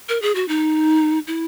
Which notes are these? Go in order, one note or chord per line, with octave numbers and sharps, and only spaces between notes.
A#4
G#4
F#4
D#4
E4